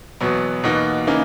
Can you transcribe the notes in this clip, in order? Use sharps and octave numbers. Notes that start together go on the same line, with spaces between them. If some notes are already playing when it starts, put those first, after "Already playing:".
E2 B2 F#3 B3
E2 B2 A#3 D#4 F#4
C#3 E3 A#3 D#4